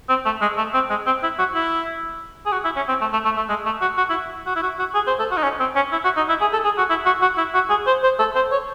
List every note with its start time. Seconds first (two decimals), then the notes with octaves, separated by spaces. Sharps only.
0.09 C4
0.25 A3
0.41 G#3
0.58 A3
0.74 C4
0.90 G#3
1.06 C4
1.23 E4
1.39 F#4
1.55 E4
2.46 G#4
2.52 F#4
2.65 E4
2.76 C#4
2.88 C4
3.01 A3
3.13 A3
3.25 A3
3.37 A3
3.49 G#3
3.66 A3
3.81 F#4
3.97 F#4
4.10 E4
4.46 F#4
4.56 E4
4.63 F#4
4.79 F#4
4.95 G#4
5.07 C5
5.20 A4
5.31 F#4
5.37 D#4
5.43 C#4
5.60 C4
5.76 C#4
5.92 E4
6.04 F#4
6.17 D#4
6.29 E4
6.41 G#4
6.53 A4
6.65 G#4
6.78 F#4
6.90 E4
7.06 F#4
7.22 F#4
7.38 E4
7.54 F#4
7.70 G#4
7.87 C5
8.03 C5
8.19 A4
8.35 C5
8.52 C#5